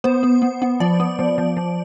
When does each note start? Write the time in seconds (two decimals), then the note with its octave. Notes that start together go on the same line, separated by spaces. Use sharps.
0.04 B3 C5
0.23 B3
0.42 B3
0.62 B3
0.80 F3 D5
1.00 B3
1.19 F3
1.38 F3
1.57 F3